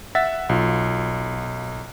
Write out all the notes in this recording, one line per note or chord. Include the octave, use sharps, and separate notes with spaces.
E5 F#5 E6 A6 B6
B1 F4